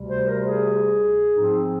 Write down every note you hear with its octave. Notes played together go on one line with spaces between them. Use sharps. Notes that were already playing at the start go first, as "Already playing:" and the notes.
Already playing: D2 C3 G3
C5
A#4
G#4
G#2 F3 C4 D#4